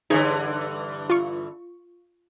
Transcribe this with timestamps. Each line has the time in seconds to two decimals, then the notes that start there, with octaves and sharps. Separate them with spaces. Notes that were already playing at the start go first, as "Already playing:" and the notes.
0.10 G2 D3 E3 D#4 G#4 C#5
1.10 F4 C#6